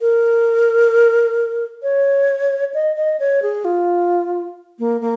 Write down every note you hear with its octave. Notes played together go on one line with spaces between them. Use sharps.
A#4
C#5
D#5
D#5
C#5
G#4
F4
A#3
A#3